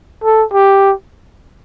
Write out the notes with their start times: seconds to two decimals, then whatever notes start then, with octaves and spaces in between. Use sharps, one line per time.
0.24 A4
0.53 G4